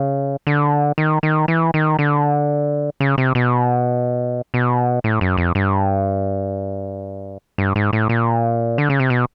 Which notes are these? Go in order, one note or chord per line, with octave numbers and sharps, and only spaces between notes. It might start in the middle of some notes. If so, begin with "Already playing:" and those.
Already playing: C#3
D3
D#3
D#3
E3
D#3
D3
C#3
C3
B2
B2
A2
F#2
F2
G2
G2
G#2
A2
A#2
D3
C#3
C3
B2